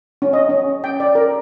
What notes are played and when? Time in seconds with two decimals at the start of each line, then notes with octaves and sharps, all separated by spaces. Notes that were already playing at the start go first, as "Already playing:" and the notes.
0.22 C#4
0.33 D#5
0.49 C#4
0.84 G5
1.00 D5
1.15 A#4